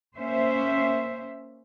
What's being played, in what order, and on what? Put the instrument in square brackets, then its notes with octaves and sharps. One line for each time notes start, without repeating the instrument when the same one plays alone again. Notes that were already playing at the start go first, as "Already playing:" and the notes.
[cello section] A#3 C#4 C5 E5